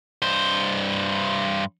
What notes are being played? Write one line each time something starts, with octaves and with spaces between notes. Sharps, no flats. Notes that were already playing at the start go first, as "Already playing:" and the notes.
G2 C5